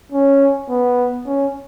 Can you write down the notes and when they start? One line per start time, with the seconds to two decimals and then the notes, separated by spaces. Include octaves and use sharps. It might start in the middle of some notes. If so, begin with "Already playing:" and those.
0.12 C#4
0.69 B3
1.26 C#4